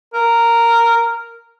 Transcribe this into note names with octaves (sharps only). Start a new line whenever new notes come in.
A#4